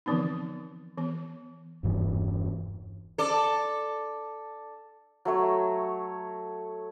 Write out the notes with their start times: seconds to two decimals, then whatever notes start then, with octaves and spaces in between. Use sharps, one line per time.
0.06 D3 E3 F3 B3 C4 D#4
0.98 E3 B3
1.83 E1 G2 E3
3.18 A4 D5
5.25 F#3 A3 C#5